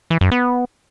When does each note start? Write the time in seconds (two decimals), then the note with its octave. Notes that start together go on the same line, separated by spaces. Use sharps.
0.10 E3
0.21 F#2
0.31 B3